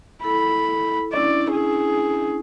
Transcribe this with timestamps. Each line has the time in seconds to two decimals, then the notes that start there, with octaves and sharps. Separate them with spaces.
0.24 E4 A4 B5
1.13 C#4 D4 E4 D5
1.51 G#4